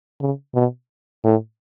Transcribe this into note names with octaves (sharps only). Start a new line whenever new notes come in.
C#3
B2
A2